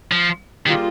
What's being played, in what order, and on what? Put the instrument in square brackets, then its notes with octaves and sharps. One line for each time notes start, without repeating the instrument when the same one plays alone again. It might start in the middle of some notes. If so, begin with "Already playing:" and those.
[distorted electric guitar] F3
[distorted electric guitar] D#3 [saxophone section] G3 A#3 F4 G#4